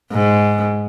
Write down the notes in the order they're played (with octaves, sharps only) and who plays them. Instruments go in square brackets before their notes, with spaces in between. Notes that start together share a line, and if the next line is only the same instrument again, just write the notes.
[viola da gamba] G#2